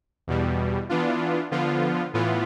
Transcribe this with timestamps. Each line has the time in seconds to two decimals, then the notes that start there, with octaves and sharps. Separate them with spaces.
0.27 E2 B2 G3
0.89 E3 B3 D4 F4
1.51 D3 F3 B3 F4
2.14 A2 E3 B3 F4